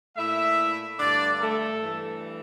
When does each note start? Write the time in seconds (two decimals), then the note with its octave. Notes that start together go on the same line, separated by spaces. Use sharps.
0.17 A#2 A3 E4 E5
1.00 G2 D3 A3 D4 D5
1.41 A3 A4
1.83 G2 E3 A3